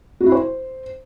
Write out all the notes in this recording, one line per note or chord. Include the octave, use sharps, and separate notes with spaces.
F#4
E4
C5